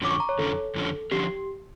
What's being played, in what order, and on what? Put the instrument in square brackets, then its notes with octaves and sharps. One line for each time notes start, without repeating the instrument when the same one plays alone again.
[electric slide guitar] F2 D3 F3 C#4 [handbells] D6
[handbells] C#6
A#5
C#5
[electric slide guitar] F2 D3 F3 C#4 [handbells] A4
[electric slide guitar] F2 D3 F3 C#4
[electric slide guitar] D3 F3 C#4 [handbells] G4